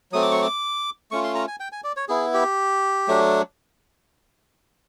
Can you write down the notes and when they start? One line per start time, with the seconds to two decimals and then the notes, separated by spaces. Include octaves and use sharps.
0.12 F#3 A3 C4 D#6
0.22 D6
0.32 C#6
0.42 D6
1.11 A3 C#4 F4 C#6
1.24 C6
1.35 A#5
1.47 G#5
1.60 G5
1.72 G#5
1.84 D5
1.97 C#5
2.09 B3 E4 G#4
2.34 G4
3.08 F#3 A3 D4